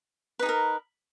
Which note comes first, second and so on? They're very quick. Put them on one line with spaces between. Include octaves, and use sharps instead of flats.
B4 D#4 G#4 A#4